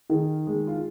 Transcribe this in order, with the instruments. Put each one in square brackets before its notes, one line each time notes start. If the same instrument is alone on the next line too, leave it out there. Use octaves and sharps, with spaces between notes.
[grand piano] D#3 G#4
G#3
F4